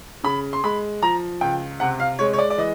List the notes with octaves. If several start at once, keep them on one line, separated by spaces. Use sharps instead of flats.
C#3 B5
C6
G#3 B5
F3 A#5
C#2 G5
C3 F#5
F5
G#3 C#5
C#5
D5
D5
E3 D#5